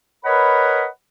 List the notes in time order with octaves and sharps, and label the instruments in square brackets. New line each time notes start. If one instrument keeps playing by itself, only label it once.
[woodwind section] A#4 B4 C#5 D#5 F#5 B5